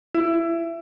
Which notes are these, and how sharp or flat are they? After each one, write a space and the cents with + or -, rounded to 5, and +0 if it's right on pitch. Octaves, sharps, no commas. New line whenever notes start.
E4 +20